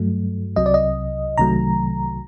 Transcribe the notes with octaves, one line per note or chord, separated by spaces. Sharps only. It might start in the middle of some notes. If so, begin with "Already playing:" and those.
Already playing: G2 F#3 A3
C2 C3 F#3 D#5
D5
D#5
C2 C3 D#3 F#3 A3 A#5